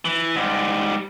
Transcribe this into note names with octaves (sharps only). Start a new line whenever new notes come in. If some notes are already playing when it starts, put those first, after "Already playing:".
E3
G#2 G3